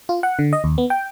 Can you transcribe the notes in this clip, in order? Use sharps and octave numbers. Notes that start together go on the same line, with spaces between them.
F4
F#5
D3
D#5
D#2
B3
G5